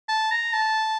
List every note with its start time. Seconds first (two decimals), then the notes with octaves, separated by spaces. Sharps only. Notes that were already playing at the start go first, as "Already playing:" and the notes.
0.09 A5
0.31 A#5
0.53 A5